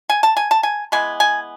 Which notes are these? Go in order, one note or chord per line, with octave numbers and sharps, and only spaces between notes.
G#5
A5
G#5
A5
G#5
E3 G#3 B3 G#5
G#5